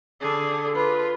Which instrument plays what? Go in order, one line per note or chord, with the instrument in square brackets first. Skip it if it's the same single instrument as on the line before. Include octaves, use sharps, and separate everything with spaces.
[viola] D3 G#4
[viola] F4 [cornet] B4